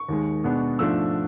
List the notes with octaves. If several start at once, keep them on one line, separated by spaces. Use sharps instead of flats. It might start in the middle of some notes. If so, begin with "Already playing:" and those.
Already playing: C#6
D#2 D#3 G#3
B2 G#3 B3 D4
G#2 F3 A3 D4 E6